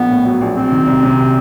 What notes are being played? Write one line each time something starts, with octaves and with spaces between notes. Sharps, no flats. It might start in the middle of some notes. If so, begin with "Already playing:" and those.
Already playing: A#1 A#3 B3
A2
F#3
A#1
F#3 C4
D#3
C2
C3